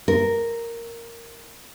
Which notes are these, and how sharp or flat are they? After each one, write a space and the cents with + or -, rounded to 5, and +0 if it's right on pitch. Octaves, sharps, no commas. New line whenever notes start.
A#4 -5